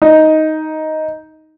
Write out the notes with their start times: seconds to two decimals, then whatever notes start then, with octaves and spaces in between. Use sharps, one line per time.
0.02 D#4